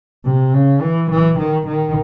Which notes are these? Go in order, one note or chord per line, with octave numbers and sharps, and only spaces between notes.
C3
C#3
E3
E3
D#3
D#3